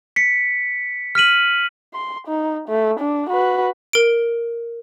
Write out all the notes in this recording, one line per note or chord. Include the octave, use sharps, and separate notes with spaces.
B6 C#7
F6 B6 D#7 F#7
C6
D#4
A3
D4
F#4 B4
A#4 D7